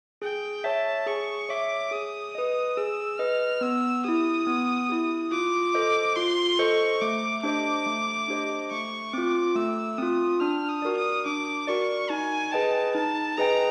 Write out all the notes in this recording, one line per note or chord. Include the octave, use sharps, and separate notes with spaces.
G#4 G5
C#5 E5 A5
G#4 C#6
C#5 E5 D6
G#4 D#6
B4 D#5
G#4 E6
B4 D#5 F6
B3 E6
E4 G4 D#6
B3
E4 G4
F4 D6
A4 C5 D#5
F4 C6
A4 C5 D#5 C#6
A3 D6
D4 G4 C5 D#5 D6
A3
D4 G4 C5 D#5
A3 C#6
C4 F4 D6
A3 E6
C4 F4 D#6
D4 F6
D#6
F#4 A#4 D5
D#6
D4 D6
F#4 A#4 D5 C#6
D#4 G#5
G#4 B4 D#5 G5 A5
D#4 A5
G#4 B4 D#5 G5 A#5